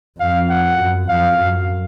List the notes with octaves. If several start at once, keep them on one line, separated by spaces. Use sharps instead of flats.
F2 F5
F#5
F#2
F2 F5
F#2